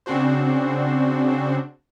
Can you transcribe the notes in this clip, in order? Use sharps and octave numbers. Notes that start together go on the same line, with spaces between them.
C#3 C4 D4 F#4 C5